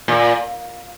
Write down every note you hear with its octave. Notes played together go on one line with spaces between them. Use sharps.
A#2